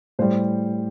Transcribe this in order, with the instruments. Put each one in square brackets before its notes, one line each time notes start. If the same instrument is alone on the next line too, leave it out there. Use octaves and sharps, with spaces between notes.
[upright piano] A2 G3 C5